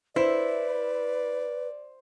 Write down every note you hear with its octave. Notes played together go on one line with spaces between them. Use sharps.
E4 B4 C5 D5